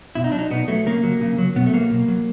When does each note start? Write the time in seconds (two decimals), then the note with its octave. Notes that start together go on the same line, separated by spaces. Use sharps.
0.15 B2 E4
0.24 D#4
0.32 F#3 D4
0.39 D#4
0.50 B2 B3
0.68 F#3 A3
0.86 C#3 A#3
1.03 F#3
1.21 C#3
1.38 F#3
1.56 B2 B3
1.66 A3
1.73 F#3 A#3
1.91 B2
2.08 F#3